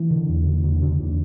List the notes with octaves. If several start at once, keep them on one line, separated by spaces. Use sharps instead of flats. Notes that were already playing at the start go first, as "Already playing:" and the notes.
Already playing: E3
D3
E2
D3
E2 D3
D3
E2